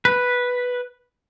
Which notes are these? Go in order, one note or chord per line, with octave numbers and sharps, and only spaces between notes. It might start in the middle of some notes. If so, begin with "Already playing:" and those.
B4